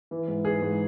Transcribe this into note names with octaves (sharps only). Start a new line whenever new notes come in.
E3
G#2
E3 G#4
G#2